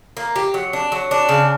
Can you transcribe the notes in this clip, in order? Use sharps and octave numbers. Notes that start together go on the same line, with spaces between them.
A#3
G4
F#3
D4
F#3
D4
C#3